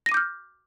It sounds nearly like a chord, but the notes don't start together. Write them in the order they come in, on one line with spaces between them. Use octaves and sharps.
A#6 D#7 D6 G6 F6